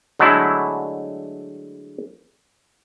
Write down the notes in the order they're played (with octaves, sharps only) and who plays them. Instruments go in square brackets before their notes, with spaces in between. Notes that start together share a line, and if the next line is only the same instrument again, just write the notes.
[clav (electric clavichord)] D3 F#3 G#3 A3 E4